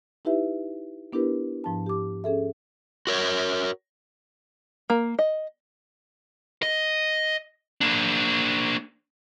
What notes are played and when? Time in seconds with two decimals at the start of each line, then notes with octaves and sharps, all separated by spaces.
0.25 D#4 E4 G4 B4 E5
1.13 B3 D4 E4 G4 A#4 B4
1.64 G#2 F3 D4 A5
1.87 G4 D6
2.24 C#4 G#4 A4 E5
3.07 F#4 A#4 C#5
4.90 A#3
5.19 D#5
6.63 D#5
7.81 A#3 D4